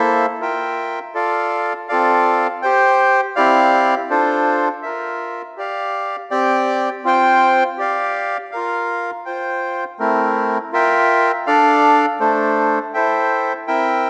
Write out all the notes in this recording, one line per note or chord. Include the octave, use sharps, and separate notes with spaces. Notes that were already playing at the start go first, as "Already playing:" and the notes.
Already playing: A#3 E4 A4 C5 E5
F4 A#4 E5 G5
F4 A4 D5 F5
C4 F4 A4 D5 F5
G4 C5 G5
C4 E4 G4 D5 F5
D4 F4 A4 C5
F4 A#4 E5
G4 D5 F5
C4 G4 D5 G5
C4 F4 C5 G5
G4 D5 F5
F4 A#4 F5
F4 C5 G5
A3 C4 E4 A#4
F4 A#4 E5 G5
D4 A4 D5 F5
A3 D4 A4 C5
E4 A4 C5 E5 G5
C4 E4 A#4 E5 G5